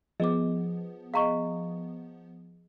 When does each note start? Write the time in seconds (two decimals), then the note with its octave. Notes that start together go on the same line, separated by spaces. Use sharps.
0.20 F3 B3 G#4 D#5 D6
1.14 G#4 D#5 F5 A#5 C#6